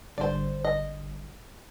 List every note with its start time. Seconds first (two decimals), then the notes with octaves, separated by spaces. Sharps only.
0.18 G#1 D3 G3 C5 D5
0.65 D#5